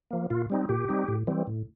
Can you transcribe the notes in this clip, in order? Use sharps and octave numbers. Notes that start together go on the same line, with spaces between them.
F3 A#3
A#2 F4
G3 C4 D#4
A#2 G4
G3 C4 D#4
A2
E3 G3 C4
A2